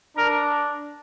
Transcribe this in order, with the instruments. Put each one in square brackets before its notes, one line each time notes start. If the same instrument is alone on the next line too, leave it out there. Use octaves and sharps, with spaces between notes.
[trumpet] D4 [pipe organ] A#4